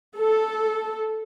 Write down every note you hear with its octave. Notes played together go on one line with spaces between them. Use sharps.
A4